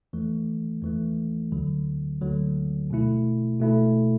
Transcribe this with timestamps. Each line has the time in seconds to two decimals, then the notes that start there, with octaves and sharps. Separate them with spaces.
0.13 E2 E3 A3
0.82 E2 E3 A3
1.52 D2 D3 F#3
2.21 D2 D3 F#3
2.90 B2 A3 E4
3.60 B2 A3 E4